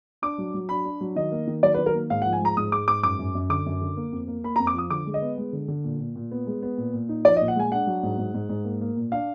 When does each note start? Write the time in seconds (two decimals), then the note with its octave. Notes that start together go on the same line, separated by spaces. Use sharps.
0.22 D4 D6
0.38 F#3
0.54 F#3
0.69 D4 B5
0.85 D4
1.01 F#3
1.16 D#3 D#5
1.32 A#3
1.47 D#3
1.63 F#3 D5
1.74 B4
1.78 D#3
1.86 A#4
1.94 A#3
2.10 G#2 F5
2.22 F#5
2.25 F3
2.33 G#5
2.41 G#3 A#5
2.57 G#2 D#6
2.72 G#3 D6
2.88 G#2 D6
3.03 F#2 D6
3.19 F#2
3.35 F#2
3.50 D3 D6
3.66 F#2
3.81 D3
3.97 A#3
4.13 F2
4.28 A#3
4.44 A#3 B5
4.56 A#5
4.60 F2
4.67 D6
4.75 F3 D#6
4.90 D3 D6
5.06 G#3
5.14 D#5
5.22 B3
5.38 G#3
5.53 D3
5.68 D3
5.84 A#2
6.00 A#2
6.16 A#2
6.31 B3
6.47 G#3
6.62 B3
6.78 A#2
6.93 A#2
7.09 D#4
7.25 F3 D5
7.37 D#5
7.41 A#2
7.48 F#5
7.56 G#3 G#5
7.72 D4 F#5
7.87 F#3
8.03 G#2
8.18 G#2
8.34 G#2
8.49 G#2
8.64 A#3
8.81 A#3
8.96 A#2
9.12 D4 F5